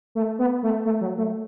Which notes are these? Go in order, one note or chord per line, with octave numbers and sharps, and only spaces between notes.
A3
B3
A3
A3
F#3
A3